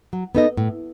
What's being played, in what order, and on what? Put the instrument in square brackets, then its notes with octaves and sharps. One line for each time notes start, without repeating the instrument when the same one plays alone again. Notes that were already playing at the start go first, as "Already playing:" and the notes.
[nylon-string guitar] F#3
B3 D#4 A4 D#5
A2